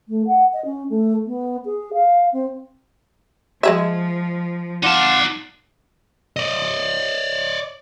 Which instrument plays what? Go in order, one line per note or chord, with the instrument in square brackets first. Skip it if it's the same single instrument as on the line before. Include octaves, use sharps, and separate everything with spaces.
[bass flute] A3
F#5
D#5
C#4
A3
B3
G#4
F5
C4
[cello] F3 [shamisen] G#3 G#4 E5
[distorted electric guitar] D#4 A5 [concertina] F4 D5 F#5
[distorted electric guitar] D5 D#5